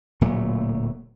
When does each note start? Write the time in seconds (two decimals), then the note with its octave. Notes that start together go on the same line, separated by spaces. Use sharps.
0.21 D1 A#2 F#3 A3